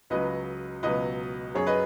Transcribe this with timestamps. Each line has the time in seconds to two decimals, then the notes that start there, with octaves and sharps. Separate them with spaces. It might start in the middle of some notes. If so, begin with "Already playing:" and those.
0.10 C#2 C#3 F#3 B4 D#5
0.83 C#2 B2 F#3 B4 D#5
1.55 F#2 F#3 G#4 C#5
1.67 B4 D#5